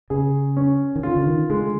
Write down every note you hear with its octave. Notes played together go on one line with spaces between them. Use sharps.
C#3 G#4
C#4
D#3
D3 F4
D3
D#3
D3 G#3